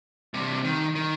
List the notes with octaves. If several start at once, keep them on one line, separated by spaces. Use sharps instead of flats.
G2 C3
D#3
D#3